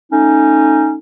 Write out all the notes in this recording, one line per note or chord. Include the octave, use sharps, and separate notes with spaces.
A3 C#4 D#4